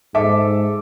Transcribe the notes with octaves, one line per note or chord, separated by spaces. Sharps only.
G#2 A4 E5 D6